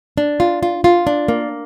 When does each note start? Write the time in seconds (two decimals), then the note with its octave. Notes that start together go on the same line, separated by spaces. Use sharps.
0.17 D4
0.40 F4
0.63 F4
0.84 F4
1.07 D4
1.28 A#3